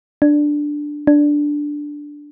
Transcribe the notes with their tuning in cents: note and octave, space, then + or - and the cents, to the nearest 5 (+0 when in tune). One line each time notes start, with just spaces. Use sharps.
D4 +5
D4 +0